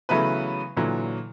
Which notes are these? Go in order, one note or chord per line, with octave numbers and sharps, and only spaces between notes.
C#3 E3 F#3 A3 B3 B4
A#2 D3 E3 F#3